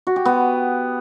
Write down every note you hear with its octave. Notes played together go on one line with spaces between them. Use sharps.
F#4
G4
B3